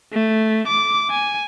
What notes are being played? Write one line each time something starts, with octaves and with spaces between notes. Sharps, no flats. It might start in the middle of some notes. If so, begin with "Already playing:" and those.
A3
D6
G#5